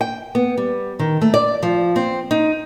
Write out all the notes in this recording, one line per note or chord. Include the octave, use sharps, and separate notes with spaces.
G5
B3
G3
D#3
A3
D5
F3
C4
D#4